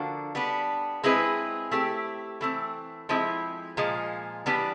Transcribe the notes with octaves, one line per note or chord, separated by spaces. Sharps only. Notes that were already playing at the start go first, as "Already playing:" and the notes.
Already playing: D3 F3 A#3 D4 F#4
G3 B3 D4
G#3 C4 E4 G#4 B4
A3 C4 E4 G4
E3 A3 C4
F3 G#3 C4 E4
A#2 F3 G#3
E3 G3 B3 D4 G4